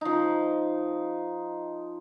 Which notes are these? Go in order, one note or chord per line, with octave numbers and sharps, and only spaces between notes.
F3 D#4